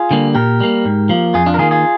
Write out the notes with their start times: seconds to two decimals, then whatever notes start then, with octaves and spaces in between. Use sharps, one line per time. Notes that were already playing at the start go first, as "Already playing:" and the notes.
Already playing: F4 G#4
0.11 D3 G3 A#3
0.35 A#2 G4 A#4
0.60 G3 A#3
0.85 G#2
1.09 F3 A#3
1.34 F2 F4 G#4
1.46 D4 F4
1.54 A#4
1.58 D#3 A#3 F4 G#4
1.71 F4 G#4